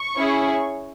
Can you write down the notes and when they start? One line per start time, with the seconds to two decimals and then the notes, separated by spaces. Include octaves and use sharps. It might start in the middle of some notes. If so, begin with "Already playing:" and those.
Already playing: C#6
0.16 C#4 E4 G#4